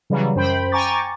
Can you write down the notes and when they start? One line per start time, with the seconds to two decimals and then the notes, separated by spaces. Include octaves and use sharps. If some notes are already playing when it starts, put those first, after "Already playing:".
0.10 C#3 E3 F#3 G3
0.36 F#2 C5 G5 B5
0.72 G5 G#5 A#5 C#6 D6 A6